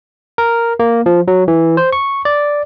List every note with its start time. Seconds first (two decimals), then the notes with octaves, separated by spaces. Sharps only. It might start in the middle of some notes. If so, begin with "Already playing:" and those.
0.38 A#4
0.80 A#3
1.06 F3
1.28 F#3
1.48 E3
1.77 C5
1.93 C#6
2.25 D5